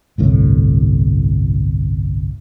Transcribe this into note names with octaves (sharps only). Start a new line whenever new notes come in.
G1 C2 A2